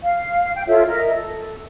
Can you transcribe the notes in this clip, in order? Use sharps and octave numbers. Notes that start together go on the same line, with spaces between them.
F5
G5
F4 A4 C#5 E5
A#4 D#5 E5
A4